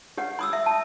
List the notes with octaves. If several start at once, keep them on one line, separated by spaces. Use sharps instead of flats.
G4 C#5 F#5
B5 D#6 E6
E5
A5